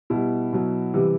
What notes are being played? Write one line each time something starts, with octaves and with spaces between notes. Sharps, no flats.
B2 G3 E4
B2 F#3
C3 E3 G3